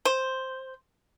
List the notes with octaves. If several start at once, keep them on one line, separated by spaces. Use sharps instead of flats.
C5